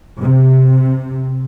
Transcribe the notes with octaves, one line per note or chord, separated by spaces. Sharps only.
C3